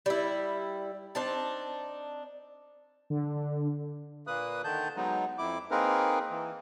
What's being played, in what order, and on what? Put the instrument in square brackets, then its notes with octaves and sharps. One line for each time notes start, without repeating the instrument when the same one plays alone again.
[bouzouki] G3 E4
C4 D4 D#4 A5
[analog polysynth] D3
[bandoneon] A#2 A#3 B4 D#6 F#6
D3 D#3 A5 G6
F#3 G#3 B3 D#4
F2 E4 D6
A#3 C4 D#4 G#4 A#4 B4
E3